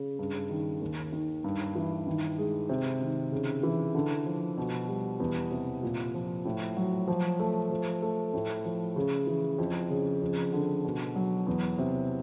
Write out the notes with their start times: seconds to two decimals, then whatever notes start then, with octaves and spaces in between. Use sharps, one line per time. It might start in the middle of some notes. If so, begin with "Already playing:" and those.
Already playing: C#3
0.19 G2
0.49 D#3
0.81 D#2
1.12 D#3
1.44 G2
1.75 E3
2.07 D#3
2.38 G#3
2.69 C3
3.01 D#3
3.32 C#3
3.63 E3
3.95 D3
4.26 F3
4.57 B2
4.89 G3
5.20 E2
5.51 C3
5.83 A#2
6.14 F3
6.45 A2
6.77 F#3
7.08 F3
7.40 A3
7.70 F3
8.02 A3
8.34 A2
8.65 F3
8.96 C#3
9.27 E3
9.58 F2
9.90 C#3
10.22 F2
10.53 D3
10.84 B2
11.16 F#3
11.47 E2
11.78 C3